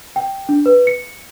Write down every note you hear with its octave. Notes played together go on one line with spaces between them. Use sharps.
G5
D4
B4
C#7